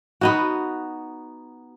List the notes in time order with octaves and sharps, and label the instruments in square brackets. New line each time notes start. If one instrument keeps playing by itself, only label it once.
[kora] B3 D#4 F#4